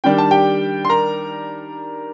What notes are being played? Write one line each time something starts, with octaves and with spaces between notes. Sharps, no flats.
D#3 G3 D4 G5
A5
G4 G5
C6
A#4 A#5